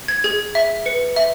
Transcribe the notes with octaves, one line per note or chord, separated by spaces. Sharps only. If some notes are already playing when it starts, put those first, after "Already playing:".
G#6
G#4 G#6
E5
B4 C#7
E5